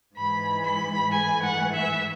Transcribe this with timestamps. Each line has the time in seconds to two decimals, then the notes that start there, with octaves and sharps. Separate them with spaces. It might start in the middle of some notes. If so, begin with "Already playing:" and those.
0.17 G#2 E3 G#3 B5
0.64 B5
1.11 G#2 E3 A3 G#5
1.43 F#5
1.75 E5